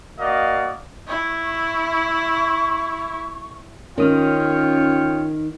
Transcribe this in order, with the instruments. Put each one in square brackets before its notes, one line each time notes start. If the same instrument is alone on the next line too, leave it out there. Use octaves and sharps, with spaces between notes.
[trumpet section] A#3 F#4 D5 D#5 F5
[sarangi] E4 [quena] C#6
[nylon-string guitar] D#3 [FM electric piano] C#4 D#6 F6 [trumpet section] F4 C#5 G5